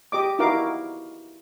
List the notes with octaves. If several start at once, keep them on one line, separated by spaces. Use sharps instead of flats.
G4 D#5 D6
D#4 E4 F#4 A#4 F5 D6